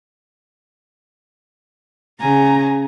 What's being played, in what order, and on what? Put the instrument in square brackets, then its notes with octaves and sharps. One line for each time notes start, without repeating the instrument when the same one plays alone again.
[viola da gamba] C#3 [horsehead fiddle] G#5 A#5